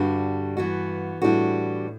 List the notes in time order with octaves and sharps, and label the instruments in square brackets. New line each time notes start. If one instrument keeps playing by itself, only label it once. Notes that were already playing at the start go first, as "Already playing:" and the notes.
Already playing: [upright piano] G2 [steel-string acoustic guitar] D3 G3 D4 F#4
[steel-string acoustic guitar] E3 B3 F#4
[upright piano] A2 [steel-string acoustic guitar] E3 G3 D4 F#4